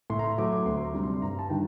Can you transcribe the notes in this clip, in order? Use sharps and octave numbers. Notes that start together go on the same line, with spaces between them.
A2 C6
A#5
C6
F#3 A3 D6
D6
D2 C6
A#5
C3 G3 D4
C6
G2 A#5
A5
D#3 G3 D4 G5